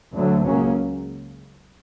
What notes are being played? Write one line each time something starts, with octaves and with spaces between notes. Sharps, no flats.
D2 D3 F#3 A3
C#2 C#3 F#3 A#3 C#4